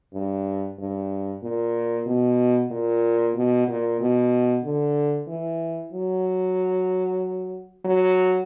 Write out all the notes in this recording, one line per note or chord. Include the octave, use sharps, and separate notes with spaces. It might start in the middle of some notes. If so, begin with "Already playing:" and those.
G2
G2
A#2
B2
A#2
B2
A#2
B2
D3
E3
F#3
F#3